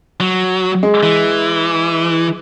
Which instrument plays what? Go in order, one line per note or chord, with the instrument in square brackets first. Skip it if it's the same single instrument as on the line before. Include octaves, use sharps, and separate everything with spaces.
[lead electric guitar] F#3
[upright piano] G#3
[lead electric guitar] E3